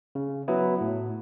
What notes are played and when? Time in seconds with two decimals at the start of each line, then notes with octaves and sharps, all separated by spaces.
0.15 C#3
0.48 F#3 B3 E4
0.81 A2